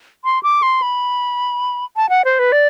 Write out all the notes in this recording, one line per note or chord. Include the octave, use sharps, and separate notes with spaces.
C6
D6
C6
B5
A5
F#5
C5
B4
D5